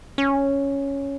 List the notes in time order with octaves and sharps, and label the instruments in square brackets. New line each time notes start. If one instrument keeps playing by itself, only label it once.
[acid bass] C#4